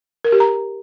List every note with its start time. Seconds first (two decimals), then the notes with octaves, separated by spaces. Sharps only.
0.24 A#4
0.32 G4
0.40 A#5